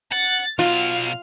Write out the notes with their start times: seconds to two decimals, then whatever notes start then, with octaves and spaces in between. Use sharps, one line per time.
0.12 F#5 A6
0.59 B2 F#3 F4 F5